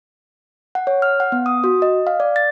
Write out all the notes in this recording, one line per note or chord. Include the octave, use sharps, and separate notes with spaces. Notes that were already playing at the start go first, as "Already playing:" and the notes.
F#5
C#5
F6
F#5
B3
D#6
F#4
D#5
F5
D5
A6